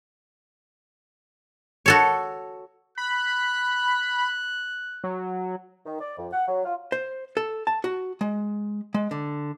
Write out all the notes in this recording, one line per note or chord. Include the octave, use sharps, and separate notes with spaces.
F#4 A4 C#5
B5 F#6
F#3
D#3
D5
F2
F#5
F#3
F4
C5
A4
A5
F#4
G#3
G#3
D3